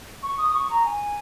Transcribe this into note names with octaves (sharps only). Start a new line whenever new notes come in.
C#6
D#6
C#6
A#5
G#5